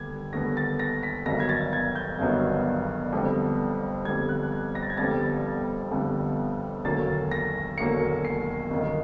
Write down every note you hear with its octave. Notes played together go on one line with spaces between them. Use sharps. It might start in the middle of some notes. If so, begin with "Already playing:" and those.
Already playing: D#2 D3 G3 B3 G#6
D#2 D3 G3 B3 A#6
A6
A#6
B6
G1 G2 D#3 F#3 B3 A#6
G#6
A6
G#6
G6
G1 G2 D#3 F#3 B3
F2 D3 G3 B3
F2 D3 G3 B3 G#6
F#6
G#6
A#6
A6
G#6
G1 F2 D3 G3 B3 A6
G1 F2 D3 G3 B3
E1 D#2 D3 F#3 A#3 A6
A#6
E1 D#2 D3 F#3 A#3 C#7
C7
G1 F#2 D#3